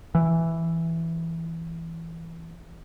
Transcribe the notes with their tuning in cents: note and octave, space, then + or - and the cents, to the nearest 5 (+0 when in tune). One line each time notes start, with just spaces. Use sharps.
E3 +5